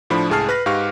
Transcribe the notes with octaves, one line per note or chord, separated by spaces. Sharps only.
A2 F3 D4 B5
C#2 A2 G#4 A5 F6 C7
B4 F#6 A#6
G#2 G4 B4 F5 C#6 F6